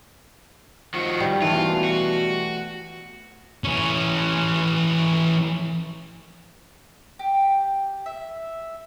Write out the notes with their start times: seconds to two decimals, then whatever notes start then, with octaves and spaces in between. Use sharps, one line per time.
0.94 D#3 F3 F#4
1.20 G3
1.42 D#3 E3 A3 F4
1.54 B2
1.84 F#4
3.64 E3 C#4
7.19 G4
8.06 E5